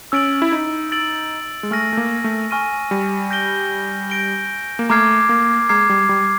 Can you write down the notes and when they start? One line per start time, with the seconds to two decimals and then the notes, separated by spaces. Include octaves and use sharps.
0.12 C#4 E6 A6 D7 F#7
0.42 E4
0.52 D#4
0.92 E6 A6 D7 F#7
1.63 G#3
1.71 A3 G#5 C#6 F6 A#6 D#7
1.93 A3
1.97 A#3
2.24 A3
2.51 G#5 C#6 F6 A#6 D#7
2.91 G3
3.31 G6 A#6 D7 G7
4.10 G6 A#6 D7 G7
4.79 A#3
4.90 A3 A#5 D6 F6 G#6 C7
5.29 A#3
5.69 G#3 A#5 D6 F6 G#6 C7
5.89 G3
6.09 G3